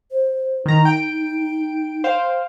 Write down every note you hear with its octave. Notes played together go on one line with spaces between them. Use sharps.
C5
D#3 D#4 A#5
G5 D7
C5 F5 G5